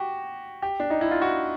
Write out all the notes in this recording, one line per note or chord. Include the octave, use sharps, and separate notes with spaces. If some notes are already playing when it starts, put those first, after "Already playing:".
Already playing: F#4 G4
G4
D4
D#4
E4
F4
F#4